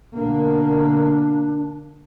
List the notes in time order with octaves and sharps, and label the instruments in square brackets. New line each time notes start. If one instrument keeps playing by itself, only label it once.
[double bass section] B2 D3 A#3 [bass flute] D4